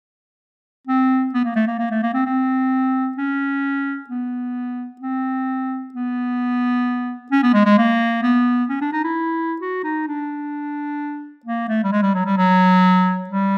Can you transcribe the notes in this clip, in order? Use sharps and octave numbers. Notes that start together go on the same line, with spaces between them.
C4
B3
A#3
A3
A#3
A#3
A3
A#3
C4
C4
C#4
B3
C4
B3
C#4
B3
G#3
G#3
A#3
B3
C#4
D4
D#4
E4
F#4
D#4
D4
A#3
A3
G3
G#3
G3
F#3
G3
F#3
G3